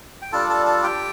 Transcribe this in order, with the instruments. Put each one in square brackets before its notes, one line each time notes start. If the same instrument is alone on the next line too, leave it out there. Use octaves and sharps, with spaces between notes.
[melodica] G5
G3 D4 F4 A4 A5
A4 A5
A4 A5
G4 G5